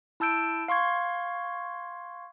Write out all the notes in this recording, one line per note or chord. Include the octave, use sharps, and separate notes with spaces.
E4 A5 E6 G6 D7
F5 C6 C#6 G#6